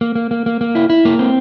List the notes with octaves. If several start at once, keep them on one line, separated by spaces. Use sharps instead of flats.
A#3
A#3
A#3
A#3
A#3
E4
E4
A#3
C4